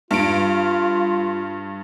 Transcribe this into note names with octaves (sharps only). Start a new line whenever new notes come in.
G2 F4 D7